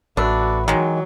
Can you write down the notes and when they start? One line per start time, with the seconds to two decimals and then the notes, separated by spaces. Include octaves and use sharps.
0.17 A1 D4 F#4 A4 B4 E5
0.68 D#3 E3 F#3 G#3